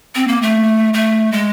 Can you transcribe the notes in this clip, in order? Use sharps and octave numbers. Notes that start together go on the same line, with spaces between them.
C4
A#3
A3
A3
G#3